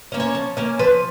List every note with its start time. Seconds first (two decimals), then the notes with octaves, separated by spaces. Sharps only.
0.12 A#3 C#4
0.20 C#5
0.35 F3
0.57 A#3 C#4
0.79 F3 B4